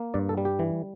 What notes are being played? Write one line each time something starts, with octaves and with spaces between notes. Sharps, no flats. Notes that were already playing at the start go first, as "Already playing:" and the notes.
Already playing: A#3
G2 D5
A4
G3
G4
E3